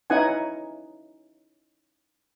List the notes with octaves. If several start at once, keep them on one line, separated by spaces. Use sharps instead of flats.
C#4 D#4 E4 B4 F#5 G#5